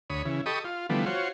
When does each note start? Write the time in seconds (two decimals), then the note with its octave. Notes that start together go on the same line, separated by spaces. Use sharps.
0.10 D2 C#5 B5 D#6
0.25 C#3 E3
0.46 G4 A4 D#5 B5 C#6 D#6
0.64 F4
0.90 D3 E3 F3 G3 A3 B3
1.06 F4 F#4 C5 C#5